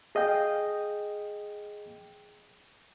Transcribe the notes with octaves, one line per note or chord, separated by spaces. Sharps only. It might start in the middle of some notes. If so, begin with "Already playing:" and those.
G#4 D#5 F5 G5